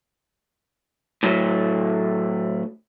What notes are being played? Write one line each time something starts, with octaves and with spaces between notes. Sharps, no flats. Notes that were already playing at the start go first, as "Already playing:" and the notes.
A2 F#3 A3